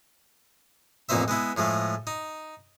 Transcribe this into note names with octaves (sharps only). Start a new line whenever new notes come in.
A1 F2 A#2 D#4 C5 E5
G#3 B3 E4
A2 F3 G#3 A3
D#4